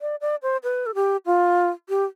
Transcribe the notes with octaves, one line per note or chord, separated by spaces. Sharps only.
D5
D5
C5
B4
A4
G4
F4
G4